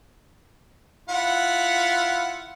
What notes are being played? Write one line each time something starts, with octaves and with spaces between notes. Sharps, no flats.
E4 F4 F#5